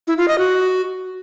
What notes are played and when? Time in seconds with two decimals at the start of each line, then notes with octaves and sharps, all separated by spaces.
0.07 E4
0.18 F4
0.28 D#5
0.38 F#4